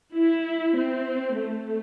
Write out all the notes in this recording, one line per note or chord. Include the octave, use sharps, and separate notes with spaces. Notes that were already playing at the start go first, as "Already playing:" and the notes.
E4
C4
A3